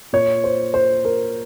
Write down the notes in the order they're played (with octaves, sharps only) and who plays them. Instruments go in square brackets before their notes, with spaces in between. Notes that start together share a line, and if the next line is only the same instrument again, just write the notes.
[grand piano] A#2 C#5
C5
C5
A#4